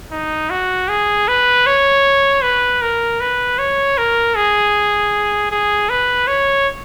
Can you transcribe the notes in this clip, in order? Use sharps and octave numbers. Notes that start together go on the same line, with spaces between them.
D#4
F#4
G#4
B4
C#5
B4
A#4
B4
C#5
A#4
G#4
G#4
B4
C#5